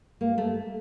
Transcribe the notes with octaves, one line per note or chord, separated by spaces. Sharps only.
A#3
A3